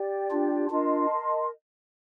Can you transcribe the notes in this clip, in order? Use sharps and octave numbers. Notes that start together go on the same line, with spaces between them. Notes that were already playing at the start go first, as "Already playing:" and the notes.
Already playing: G4 D5 G5
D4 F4
D4 F4 A#4 D#5 A5 C6